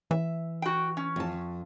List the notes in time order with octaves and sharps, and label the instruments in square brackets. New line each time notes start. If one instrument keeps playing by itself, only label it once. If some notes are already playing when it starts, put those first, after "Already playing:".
[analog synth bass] E3 [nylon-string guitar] E5
[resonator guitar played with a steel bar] F#4 G5
C#4
[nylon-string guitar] F2 A5